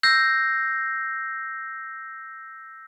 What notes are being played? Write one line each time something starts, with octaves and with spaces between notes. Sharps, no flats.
E6 G6 A#6 C7